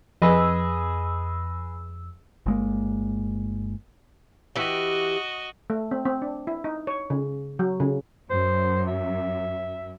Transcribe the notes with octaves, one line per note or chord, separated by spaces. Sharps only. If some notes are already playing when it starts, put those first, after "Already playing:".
F2 G#4 B4 D#5 E6
G1 G#3 A#3
E3 F#4 G4 D#5
A3
C4
C4
D4
E4
D#4
C#5
C#3
F#3
C#3
F#2 C5
E5